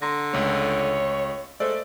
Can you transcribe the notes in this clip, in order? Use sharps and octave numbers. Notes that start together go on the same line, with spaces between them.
D3 A#5 C6 A#6
C#2 A3 C#5
G#3 A3 C5 D5 E6